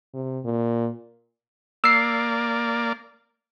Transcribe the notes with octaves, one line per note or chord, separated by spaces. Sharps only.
C3
A#2
A#3 D5 E6 C7